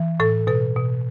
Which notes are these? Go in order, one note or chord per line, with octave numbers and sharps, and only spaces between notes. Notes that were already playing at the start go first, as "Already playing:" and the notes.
Already playing: E3
A2 A4
B2 A4
B2